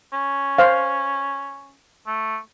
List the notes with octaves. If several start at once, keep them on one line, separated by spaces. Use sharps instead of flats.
C#4
C5 F5
A3